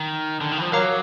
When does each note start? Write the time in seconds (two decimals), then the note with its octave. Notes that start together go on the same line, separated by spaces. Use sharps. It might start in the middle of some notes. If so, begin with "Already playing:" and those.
Already playing: D#3
0.41 D3
0.52 D#3
0.58 E3
0.62 F3
0.72 F#3 A#4 C#5 F5 A#5 D6